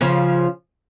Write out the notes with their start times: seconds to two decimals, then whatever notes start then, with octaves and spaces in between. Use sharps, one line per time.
0.01 C#3 F3